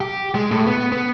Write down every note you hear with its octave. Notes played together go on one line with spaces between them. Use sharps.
G4
G#3
A2
B3
B3